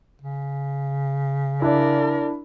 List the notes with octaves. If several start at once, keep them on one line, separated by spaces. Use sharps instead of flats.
C#3
D4 E4 A#4 D5